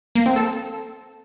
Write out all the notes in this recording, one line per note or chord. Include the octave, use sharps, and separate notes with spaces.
A#3
C4
A4